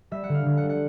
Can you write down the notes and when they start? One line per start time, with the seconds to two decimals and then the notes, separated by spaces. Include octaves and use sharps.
0.11 G3 E5
0.24 F#5
0.29 D3
0.34 F5
0.46 D3
0.57 F#5
0.63 G3
0.69 F#5